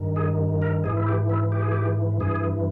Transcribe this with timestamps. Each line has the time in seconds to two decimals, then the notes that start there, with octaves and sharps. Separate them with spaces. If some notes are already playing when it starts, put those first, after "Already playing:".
Already playing: G2 D#3
0.16 G#4
0.62 A#4
0.84 G#2 E3 G#4
0.97 E4
1.07 G4
1.29 E4
1.52 G4
1.62 G#4
1.71 G4
2.20 G2 E3 G#4